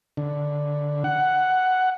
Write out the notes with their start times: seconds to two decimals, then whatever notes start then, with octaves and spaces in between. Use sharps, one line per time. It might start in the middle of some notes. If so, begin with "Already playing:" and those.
0.17 D3
1.04 F#5